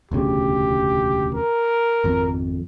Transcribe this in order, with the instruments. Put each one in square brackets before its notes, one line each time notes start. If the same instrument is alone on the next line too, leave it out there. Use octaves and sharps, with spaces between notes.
[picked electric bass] E1 D2 C#3 [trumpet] G4
[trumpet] A#4
[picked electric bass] G#1 F2